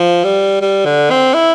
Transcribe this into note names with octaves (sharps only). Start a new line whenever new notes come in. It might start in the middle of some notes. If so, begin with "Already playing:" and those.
Already playing: F3
G3
G3
D3
C4
E4